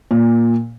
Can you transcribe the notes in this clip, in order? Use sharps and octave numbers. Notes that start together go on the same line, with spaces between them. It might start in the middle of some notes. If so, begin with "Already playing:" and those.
A#2